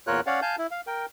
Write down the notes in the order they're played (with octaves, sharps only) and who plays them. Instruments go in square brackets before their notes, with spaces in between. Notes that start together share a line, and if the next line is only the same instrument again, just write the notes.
[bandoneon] E2 A#2 F4 A#4 C#5 F#6
C#4 C#5 D5 F5 F#5
F5 G#5 A5 G6
E4
F5
A#4 G5